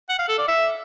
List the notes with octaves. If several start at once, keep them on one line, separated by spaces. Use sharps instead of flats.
F#5
F5
A4
D5
E5